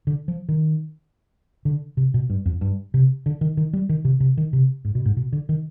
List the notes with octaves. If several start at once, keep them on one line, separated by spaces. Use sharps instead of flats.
D3
F3
D#3
D3
C3
B2
G2
F2
G2
C3
D3
D#3
D#3
G3
D#3
C3
C3
D#3
C3
G#2
B2
G#2
B2
D3
D#3